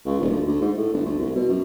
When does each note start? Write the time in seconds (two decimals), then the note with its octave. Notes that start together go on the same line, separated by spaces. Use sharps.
0.06 C#2
0.20 D#1
0.31 D2
0.47 D2
0.61 G#2
0.76 A2
0.93 G1
1.05 D2
1.19 C2
1.35 B2
1.49 F#2